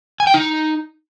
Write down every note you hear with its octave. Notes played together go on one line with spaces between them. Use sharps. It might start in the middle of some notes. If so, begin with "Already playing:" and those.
G#5
G5
D#4